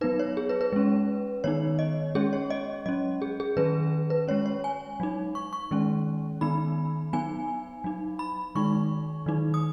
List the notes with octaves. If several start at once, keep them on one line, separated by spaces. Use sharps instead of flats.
F#3 B3 D#4 B4
C#5
G#4
B4
B4
G#3 C#4
D#3 B3 D#4 C#5
D#5
G#3 C#4 G#4
C#5
D#5
F#3 C#4 D#5
G#4
G#4
D#3 F#3 C#4 B4
B4
G#3 C#4 C#5
C#5
G#5
F#3 D#4
C#6
C#6
D#3 G#3 C#4
D#3 B3 D#4 B5
F#3 B3 D#4 G#5
F#3 D#4
B5
D#3 G#3 D#4 C#6
D#3 F#3 D#4
D#6